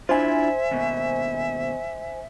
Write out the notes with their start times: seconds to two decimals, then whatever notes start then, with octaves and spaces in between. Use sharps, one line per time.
0.09 D4 E4 F4 C5 E5 G#5
0.71 D#2 B2